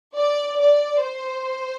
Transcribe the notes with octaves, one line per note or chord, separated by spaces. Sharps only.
D5
D5
C5